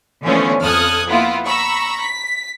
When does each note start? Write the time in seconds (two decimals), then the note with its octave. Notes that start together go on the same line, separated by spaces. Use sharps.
0.24 D3 E3 F3 A3 B3 C#4
0.60 F2 A4 D#6 F6 F#6 G#6
1.09 A#3 B3 E4 F4
1.46 A#5 B5 C#6 E6
2.01 B6